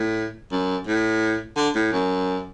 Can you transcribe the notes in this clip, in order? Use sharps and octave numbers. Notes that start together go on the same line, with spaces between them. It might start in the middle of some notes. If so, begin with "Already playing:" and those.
Already playing: A2
F#2
A2
D3
A2
F#2